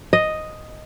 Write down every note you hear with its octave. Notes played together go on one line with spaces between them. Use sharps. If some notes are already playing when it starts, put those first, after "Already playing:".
D#5